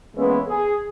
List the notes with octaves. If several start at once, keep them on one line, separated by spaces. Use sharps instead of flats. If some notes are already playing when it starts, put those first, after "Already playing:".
E3 G#3 A#3 B3 C#4 E4
G#4